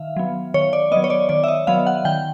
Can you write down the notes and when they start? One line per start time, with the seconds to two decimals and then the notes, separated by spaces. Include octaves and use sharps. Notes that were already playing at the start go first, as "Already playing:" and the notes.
Already playing: D#3 E5 F5
0.16 F#3 B3
0.54 D#3 C#5
0.73 D5
0.91 B3 D#5
0.96 F#3
1.04 C#5
1.10 D5
1.29 D#3 D5
1.44 E5
1.48 D#5
1.67 F#3 B3 F5
1.87 F#5
2.05 D#3 G5